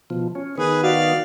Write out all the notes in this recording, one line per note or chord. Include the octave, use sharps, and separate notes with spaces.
B2 F3
C#4
D#3 B3 G#4 B4
F#4 D5 F5